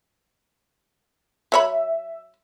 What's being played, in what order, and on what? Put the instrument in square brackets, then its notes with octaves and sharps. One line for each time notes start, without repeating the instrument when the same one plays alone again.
[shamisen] F#3 C#5 B5 [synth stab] E5